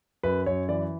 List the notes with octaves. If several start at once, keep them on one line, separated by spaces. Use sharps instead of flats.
F#2 B4
F#2 C#5
E3 D5